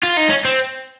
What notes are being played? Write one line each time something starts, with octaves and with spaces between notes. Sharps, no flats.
F4
D#4
C#4
C4